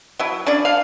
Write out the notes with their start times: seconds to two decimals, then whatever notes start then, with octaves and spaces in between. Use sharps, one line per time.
0.19 F#3 E4
0.46 C#4 D4 D5
0.65 F5